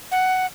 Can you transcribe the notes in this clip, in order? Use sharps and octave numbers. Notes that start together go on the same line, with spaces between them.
F#5